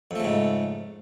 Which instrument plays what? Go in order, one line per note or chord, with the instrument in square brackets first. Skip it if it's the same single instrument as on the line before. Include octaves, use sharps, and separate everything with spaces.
[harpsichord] F2
A3
C#3
G#2